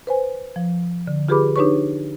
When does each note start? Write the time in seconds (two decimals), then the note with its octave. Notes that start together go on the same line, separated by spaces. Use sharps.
0.07 B4 C5 G#5
0.56 F3
1.07 D3
1.28 F4 G4 G#4 B4 B5 D6
1.56 D4 D#4 G4 B4 C#5 C#6